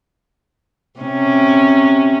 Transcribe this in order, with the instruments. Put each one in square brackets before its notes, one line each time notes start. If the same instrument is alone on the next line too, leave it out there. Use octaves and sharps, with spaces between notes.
[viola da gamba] C3 C#4